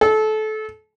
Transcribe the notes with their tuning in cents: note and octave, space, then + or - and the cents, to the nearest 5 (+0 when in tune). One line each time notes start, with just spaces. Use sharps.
A4 -25